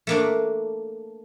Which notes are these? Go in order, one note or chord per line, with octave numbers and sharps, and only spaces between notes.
A3 A#3 D4